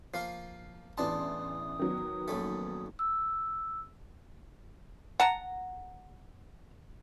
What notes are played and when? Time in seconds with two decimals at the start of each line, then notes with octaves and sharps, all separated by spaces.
0.14 F3 A#3 F4 C7
0.98 A1 E2 E3 D4 A5 C6 D#6
1.79 D#3 F#3 B3
2.28 A#1 F#2 A3
2.99 E6
5.20 F#5 A5 A#5